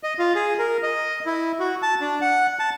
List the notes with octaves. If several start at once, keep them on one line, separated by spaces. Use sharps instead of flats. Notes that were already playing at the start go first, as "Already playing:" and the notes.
D#5
F4
G#4
A#4
D#5
E4
F#4
A5
D4
F#5
A5